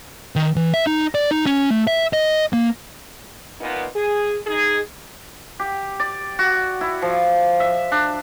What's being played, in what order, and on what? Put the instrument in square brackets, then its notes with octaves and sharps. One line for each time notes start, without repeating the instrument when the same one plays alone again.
[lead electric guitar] D#3
E3
E5
D#4
D5
D#4
C#4
A3
E5
D#5
A#3
[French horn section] A#2 B3 D#4
G#4
D#4 G#4
[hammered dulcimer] G4
D5
F#4
E4
F3
E5
D4